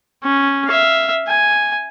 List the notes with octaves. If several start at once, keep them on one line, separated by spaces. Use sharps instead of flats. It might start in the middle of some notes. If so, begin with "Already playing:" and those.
C#4
E5 F5
G#5